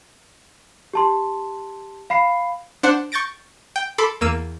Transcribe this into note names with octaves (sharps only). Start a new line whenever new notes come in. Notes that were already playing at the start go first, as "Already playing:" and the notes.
G4 A5 C6
F5 B5 C7
D4 C5 F#5
C#6 G6 A6 A#6 D7
G5
A4 B5 C6 D6
E2 A#3 E6 D#7 E7